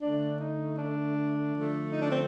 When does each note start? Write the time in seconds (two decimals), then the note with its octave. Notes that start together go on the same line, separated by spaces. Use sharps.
0.01 D3 A3 D4
0.39 D#4
0.77 D4
1.54 D3 F3 A3
1.91 D#4
2.01 D4
2.10 C4